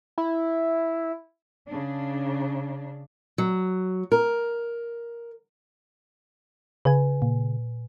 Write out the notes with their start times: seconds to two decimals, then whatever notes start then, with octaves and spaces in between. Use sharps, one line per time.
0.18 E4
1.68 C#3 D4
3.38 F#3
4.12 A#4
6.85 C#3 B4 G#5
7.22 A#2